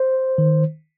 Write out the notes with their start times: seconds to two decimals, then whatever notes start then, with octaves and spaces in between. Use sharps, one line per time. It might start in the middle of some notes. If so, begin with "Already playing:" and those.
Already playing: C5
0.38 D#3